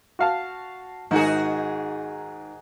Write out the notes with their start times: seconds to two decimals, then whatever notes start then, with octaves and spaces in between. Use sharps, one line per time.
0.19 F#4 F5 A5
1.11 G#2 D#3 D#4 F#4 G#4